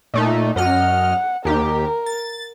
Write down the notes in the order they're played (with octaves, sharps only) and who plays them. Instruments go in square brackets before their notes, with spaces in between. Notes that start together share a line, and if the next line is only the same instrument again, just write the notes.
[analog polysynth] A#2 A3 D#4
[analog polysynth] F#2 D#5 F6 [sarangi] F#5
[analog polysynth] D#2 G4 [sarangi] A#4
[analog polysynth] A6